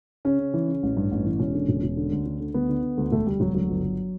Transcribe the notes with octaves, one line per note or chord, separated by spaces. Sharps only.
C#3 C#4
C#3
E3
C#3
A1
G2
A1
E3
E1 C#4
D3
E1
E1
D3
D2
D3
D3
D2 B3
D3
D3
D2
E1 A3
D2 G3
E1 F#3
D2 F#3
G1
G1